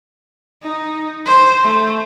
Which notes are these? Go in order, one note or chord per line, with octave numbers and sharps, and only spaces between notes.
D#4
C5
A3